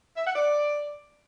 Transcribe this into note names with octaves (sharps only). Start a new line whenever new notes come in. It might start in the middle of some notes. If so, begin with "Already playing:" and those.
E5
F#5
D5